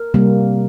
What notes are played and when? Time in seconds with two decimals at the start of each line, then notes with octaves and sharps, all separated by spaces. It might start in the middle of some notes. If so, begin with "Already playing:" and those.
Already playing: A#4
0.14 C3 G3 A#3